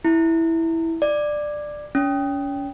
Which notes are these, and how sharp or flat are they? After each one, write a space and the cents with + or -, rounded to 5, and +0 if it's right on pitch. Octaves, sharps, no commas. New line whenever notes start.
E4 -5
D5 +15
C#4 +35